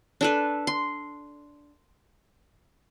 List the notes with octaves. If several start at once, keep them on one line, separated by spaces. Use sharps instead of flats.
D4 A4 B4
C6